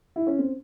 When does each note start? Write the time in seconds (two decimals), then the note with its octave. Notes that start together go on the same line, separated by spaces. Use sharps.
0.16 E4
0.27 C#4
0.39 C4